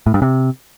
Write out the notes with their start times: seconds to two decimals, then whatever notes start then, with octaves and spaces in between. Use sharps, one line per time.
0.06 A2
0.14 G2
0.22 C3